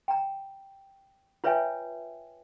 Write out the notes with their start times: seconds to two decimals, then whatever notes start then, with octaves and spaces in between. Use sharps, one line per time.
0.08 G5 A#5
1.44 F4 B4 C#5 E5 G5 G#5